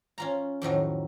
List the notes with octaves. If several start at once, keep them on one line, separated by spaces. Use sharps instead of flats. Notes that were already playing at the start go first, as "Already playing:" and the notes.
C#4 F4 A#5
F2 A2 D#3 F#3